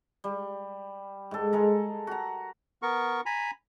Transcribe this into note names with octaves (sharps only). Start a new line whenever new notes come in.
G3
G#2 A4
G#3 A4 A#4
F#4 A#5
B3 A#4 C#6
G#5 A#5 B5